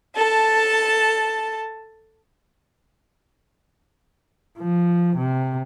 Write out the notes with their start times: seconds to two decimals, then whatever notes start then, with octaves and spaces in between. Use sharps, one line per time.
0.16 A4 A5
4.58 F3
5.17 C3